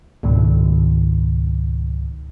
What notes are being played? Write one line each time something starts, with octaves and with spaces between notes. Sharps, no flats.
C#2 G#2 B2 D#3